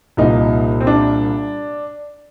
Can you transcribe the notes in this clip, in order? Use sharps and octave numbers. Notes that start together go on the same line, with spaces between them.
C2 A#2 F3 D#4
C4
D4